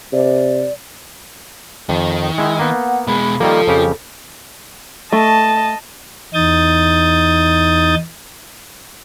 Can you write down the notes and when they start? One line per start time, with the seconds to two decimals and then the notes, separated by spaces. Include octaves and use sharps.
0.13 C3 D5
1.89 F2 D#3
2.38 G#3 E4
2.59 A#3 B3 F#5
3.07 B2 G#3 B5
3.40 D#3 F3 G3 A#3 A4
3.67 F2 C#3 G4
5.12 A3 D#5 A5
6.34 E2 D#4 D#6 G6 A6